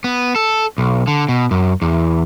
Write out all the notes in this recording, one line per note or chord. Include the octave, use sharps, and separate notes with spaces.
B3
A4
B1
D3
B2
F#2
E2